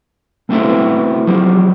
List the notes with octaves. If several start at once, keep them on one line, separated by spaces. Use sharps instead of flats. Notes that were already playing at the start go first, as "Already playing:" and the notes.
A3 B3 C4 E4 F#4 A4
F3 F#3 G#3 G4